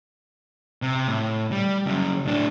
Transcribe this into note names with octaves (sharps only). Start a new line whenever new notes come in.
C3
A2
G3
C#3 F#3
A2 D4